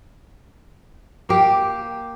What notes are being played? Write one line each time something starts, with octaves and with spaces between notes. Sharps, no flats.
A#3 G4